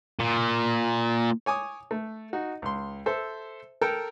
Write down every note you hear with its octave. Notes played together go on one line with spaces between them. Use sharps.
A#2
C#5 G#5 D6 D#6
A3
D#4 F#4
C#2 C6
A4 C5 E5
A4 A#4 G5 A#5